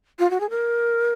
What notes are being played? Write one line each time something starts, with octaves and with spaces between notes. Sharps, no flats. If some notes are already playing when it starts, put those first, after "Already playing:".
F4
F#4
G#4
A#4